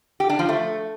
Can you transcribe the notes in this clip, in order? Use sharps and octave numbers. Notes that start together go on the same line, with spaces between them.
G4
D4
F3
A3